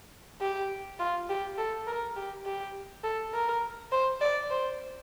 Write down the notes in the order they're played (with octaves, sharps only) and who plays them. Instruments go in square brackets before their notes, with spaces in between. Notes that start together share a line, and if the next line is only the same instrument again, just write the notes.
[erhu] G4
F4
G4
A4
A#4
G4
G4
A4
A#4
C5
D5
C5